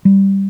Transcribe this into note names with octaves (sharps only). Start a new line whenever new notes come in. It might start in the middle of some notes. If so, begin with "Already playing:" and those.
G3